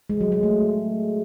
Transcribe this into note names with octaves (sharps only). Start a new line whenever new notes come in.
G#3
F#3
G#3
A3